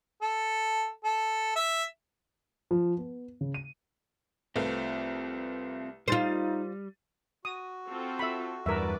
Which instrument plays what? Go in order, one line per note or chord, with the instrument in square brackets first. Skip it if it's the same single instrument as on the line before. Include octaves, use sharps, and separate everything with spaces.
[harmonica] A4
A4
E5
[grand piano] F3
B3
C#3
D#7
[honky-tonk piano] C2 A3 B4 [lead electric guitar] C4 F4
[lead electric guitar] G3 [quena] D#4 [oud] F4 C5 [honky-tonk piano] A6 D#7
[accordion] F#4 [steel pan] D#6
[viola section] C4 F4 A4
[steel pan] E5 B5
[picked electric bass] E2 G2 [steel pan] A#4 E5 [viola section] B4 D5